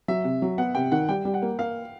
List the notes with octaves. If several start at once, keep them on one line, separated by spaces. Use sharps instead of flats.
F#3 E5
C3
F#3
B3 F#5
C3 G5
D#3 F#5
G3 G5
G3
F#5
A#3
A#3 F5